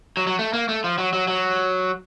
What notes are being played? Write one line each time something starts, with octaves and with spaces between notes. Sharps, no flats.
F#3
F#3
A3
A#3
A3
F3
F#3
F#3
F#3